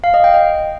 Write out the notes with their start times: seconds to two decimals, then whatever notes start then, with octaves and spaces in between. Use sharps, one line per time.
0.04 F5
0.14 D#5
0.24 G5
0.34 D#5